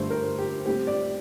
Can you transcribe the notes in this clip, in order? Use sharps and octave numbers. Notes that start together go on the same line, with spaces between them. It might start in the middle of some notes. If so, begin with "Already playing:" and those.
Already playing: G2 D3 A3 C5
A#4
G4
A2 G3 C4 G4
D5